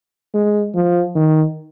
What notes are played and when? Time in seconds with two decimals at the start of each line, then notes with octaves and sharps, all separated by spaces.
0.34 G#3
0.75 F3
1.15 D#3